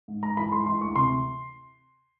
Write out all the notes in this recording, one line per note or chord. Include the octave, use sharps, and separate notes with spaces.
G#2
G#2 A#5
E3 B5
G#3 C6
E3 C6
D2 C#6
C3 C6